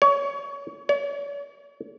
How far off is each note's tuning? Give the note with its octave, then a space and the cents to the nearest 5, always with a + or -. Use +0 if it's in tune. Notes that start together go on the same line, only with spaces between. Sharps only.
C#5 +25
C#5 +45